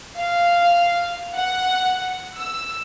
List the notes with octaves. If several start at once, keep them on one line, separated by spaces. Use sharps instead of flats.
F5
F#5
E6